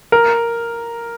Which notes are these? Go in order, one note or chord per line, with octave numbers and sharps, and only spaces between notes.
A#4